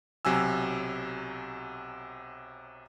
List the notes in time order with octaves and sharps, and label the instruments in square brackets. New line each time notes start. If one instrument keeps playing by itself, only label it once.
[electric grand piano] B1 C3 F#3 G#5 E6